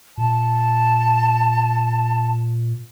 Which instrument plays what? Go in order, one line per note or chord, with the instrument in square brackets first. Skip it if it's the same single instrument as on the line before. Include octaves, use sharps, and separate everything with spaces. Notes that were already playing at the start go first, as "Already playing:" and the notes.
[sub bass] A#2 [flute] A5